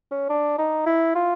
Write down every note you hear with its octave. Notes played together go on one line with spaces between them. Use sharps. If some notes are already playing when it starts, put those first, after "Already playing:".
C#4
D4
D#4
E4
F4